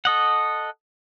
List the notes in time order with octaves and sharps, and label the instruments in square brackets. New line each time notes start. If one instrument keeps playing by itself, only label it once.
[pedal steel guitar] A4 D#5 F#5